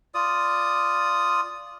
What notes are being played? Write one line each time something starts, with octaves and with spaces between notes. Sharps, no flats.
F4 D5 D#6